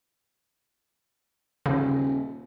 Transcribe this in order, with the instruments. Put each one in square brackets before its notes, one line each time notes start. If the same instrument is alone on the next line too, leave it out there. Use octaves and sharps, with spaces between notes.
[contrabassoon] D#1 [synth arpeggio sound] C#3